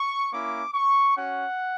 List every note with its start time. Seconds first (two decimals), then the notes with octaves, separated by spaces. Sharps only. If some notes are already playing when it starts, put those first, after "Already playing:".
Already playing: C#6
0.33 A#3 C#4 E4 D6
0.74 C#6
1.16 C#4 F#4 F#5